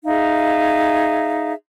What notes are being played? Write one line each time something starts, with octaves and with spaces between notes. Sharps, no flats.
D#4 G#4 E5 F5